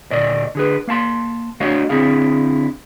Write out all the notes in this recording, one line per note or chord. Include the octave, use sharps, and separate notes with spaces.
D2 A#2 D5 D#5
D3 G#4 B4
A#3 F5 A5 C6
A3 D4 F#4 C#5 D#5 F5
D3 C4 E4 G#4 F5